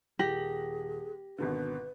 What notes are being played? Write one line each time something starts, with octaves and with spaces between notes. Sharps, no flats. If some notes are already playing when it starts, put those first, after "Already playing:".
D#1 G4 G#4 A#6 F#7
G#1 B2 D3 B4